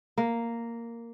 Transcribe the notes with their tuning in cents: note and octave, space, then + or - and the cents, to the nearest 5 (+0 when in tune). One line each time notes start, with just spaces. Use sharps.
A#3 -5